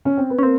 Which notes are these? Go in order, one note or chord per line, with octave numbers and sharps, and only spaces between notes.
C#4
C4
B3
C#4
A#3 C4